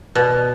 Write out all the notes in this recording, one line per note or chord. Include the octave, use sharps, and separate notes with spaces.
B2